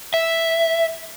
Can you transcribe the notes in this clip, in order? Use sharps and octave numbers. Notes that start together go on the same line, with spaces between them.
E5